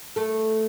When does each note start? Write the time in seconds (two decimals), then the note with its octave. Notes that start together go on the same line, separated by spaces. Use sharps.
0.16 A3 A4